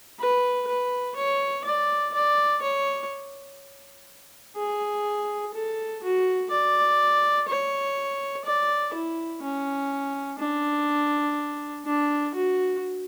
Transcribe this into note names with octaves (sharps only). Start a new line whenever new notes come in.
B4
B4
C#5
D5
D5
C#5
G#4
A4
F#4
D5
C#5
D5
E4
C#4
D4
D4
F#4